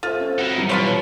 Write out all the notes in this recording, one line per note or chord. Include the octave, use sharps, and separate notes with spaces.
F4 A4 C5 E5
C#4
C4 D#4 E4 F#4 F#5
G2 E3 F#3
B2 F4 B4 C#5